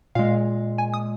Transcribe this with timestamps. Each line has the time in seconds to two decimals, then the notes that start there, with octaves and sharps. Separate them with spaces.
0.15 A#2 G#3 F5
0.78 G#5
0.94 D#6